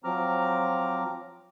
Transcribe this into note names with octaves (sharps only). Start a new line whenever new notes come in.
F3 F#3 C4 A#5 D6 F6